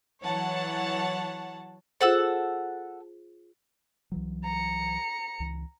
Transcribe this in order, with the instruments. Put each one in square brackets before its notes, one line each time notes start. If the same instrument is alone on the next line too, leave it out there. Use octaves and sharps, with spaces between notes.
[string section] E3 F#3 C#5 F#5 A5
[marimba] F4 G#4 C5 [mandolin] A4 F#5 E6
[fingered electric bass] C2 E3 F#3
[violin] A#5 C#7
[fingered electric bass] C#2 E3